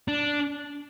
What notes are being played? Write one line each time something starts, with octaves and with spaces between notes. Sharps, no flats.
D4